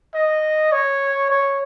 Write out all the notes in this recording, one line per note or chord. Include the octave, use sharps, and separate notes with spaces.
D#5
C#5
C#5